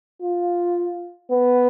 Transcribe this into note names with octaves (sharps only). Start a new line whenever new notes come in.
F4
B3